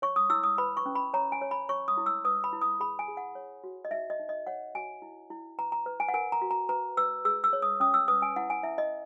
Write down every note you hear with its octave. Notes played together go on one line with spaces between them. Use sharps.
C#5 C#6
D#6
E4 E6
D#6
B4 B5
C#6
C#4
B5
C#5 A#5
G#5
C#5
B5
C#5 C#6
D#6
E4
E6
B4 D#6
B5
E4
D#6
G#4 B5
G#5
G#4
F#5
C#5
F#4
D#5
D#4 E5
D#5
D#4
D#5
C#5 F#5
F#4 G#5
E4
E4
B4 A#5
A#5
B4
G#5
F#5
A#4 G#5
A#5
F#4
A#5
B4 A#5
B4 E6
G#4 E6
E6
C#5
D#6
C#4 D#6
E6
B4 D#6
G#5
E4 F#5
G#5
E4 E5
D#5